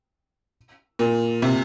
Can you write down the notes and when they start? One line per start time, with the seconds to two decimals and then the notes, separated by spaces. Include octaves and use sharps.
0.99 A#2
1.42 C3